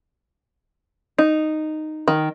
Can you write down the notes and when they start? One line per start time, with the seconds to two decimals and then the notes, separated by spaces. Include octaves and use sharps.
1.18 D#4
2.08 D#3